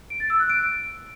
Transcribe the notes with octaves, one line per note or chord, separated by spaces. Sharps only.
D7
A6
E6
F#6
D7